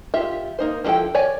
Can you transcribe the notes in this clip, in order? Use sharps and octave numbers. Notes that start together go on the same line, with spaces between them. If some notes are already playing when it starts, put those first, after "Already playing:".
F4 G4 E5
A#3 D#4 C5
F3 G3 E4 A4 G5
C#5 D5 G#5